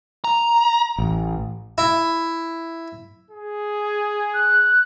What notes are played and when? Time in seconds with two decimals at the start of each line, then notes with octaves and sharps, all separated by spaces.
0.24 A#5
0.98 A1
1.78 E4
3.31 G#4
4.34 F#6